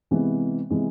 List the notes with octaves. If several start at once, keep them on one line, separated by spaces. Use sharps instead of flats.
C3 E3 G#3 B3
C3 E3 G#3 B3